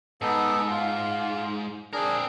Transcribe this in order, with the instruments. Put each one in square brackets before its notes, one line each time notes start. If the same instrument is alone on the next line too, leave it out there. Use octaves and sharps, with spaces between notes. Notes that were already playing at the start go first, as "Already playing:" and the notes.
[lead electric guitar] G#2 [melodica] B3 D#4 A4
[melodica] F4
[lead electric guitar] C4 A#4 [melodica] D4 G#4